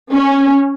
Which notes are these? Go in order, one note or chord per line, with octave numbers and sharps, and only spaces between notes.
C#4